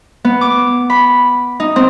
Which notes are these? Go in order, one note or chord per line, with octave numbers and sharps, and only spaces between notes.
B3
D6
B5
D#4
C4